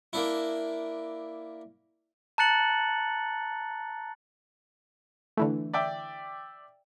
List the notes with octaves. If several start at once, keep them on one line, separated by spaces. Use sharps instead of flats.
A#3 D4 E4
A5 A#5 F#6 A6 C#7 F#7
D3 E3 A3
D5 E5 G5